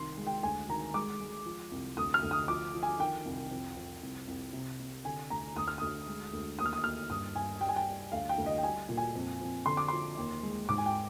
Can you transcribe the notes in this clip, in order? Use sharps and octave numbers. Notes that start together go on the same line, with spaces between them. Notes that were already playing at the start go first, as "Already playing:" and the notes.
Already playing: C2 D#3 C6
G#3
G5
D2 G#5
D#3 A#5
G#3 D6
G#3
F3
C2
D2 D#6
F6
D2
D#6
F3 D6
F3
G#5
D#3 G5
C2
F2
F2
C2
C2
C3
C3
D3 G#5
D2 A#5
D2 D#6
F6
D2 D#6
G#3
D2
D#2 D#6
F6
D#6
D#2 F6
G2 D#6
G2 G#5
G3 G5
G#5
G5
G3
D2 F5
G5
D2
D#5
G5
G3 G#5
A#2
G#5
F2
F2
D3 C6
D6
F3 C6
D#2
G#3
G#2 D6
G#5
G5